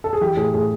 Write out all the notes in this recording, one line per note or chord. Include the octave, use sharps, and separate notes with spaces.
A4
G#4
E3 G4
A2 G#4
A2 G#4